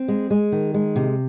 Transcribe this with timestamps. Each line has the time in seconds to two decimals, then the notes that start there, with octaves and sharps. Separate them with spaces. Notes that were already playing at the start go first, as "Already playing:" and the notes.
Already playing: C4
0.08 G#3
0.30 G#3
0.52 D#3
0.74 G#3
0.96 C3